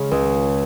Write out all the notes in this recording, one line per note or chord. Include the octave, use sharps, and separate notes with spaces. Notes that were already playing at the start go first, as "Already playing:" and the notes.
Already playing: C#3 G#3 C#4
C#2